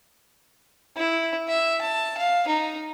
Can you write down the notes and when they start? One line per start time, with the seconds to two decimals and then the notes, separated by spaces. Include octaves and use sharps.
0.97 E4
1.49 E5
1.81 A5
2.17 F5
2.47 D#4